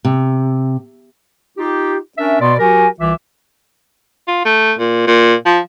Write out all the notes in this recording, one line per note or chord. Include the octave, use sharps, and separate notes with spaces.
C3
D#4 F4 G4
C#4 D4 A#4 E5
B2 B3 B4 D5 C6
F#3 F#4 G4 A#4 G#5
C2 E3 F4 E5 D6
F4
A3
A#2
A#2
F3